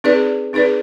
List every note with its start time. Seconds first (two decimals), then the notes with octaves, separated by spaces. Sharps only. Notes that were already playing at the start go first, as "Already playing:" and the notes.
0.04 C4 D#4 G#4 B4 D5
0.53 C4 D#4 G#4 B4 D5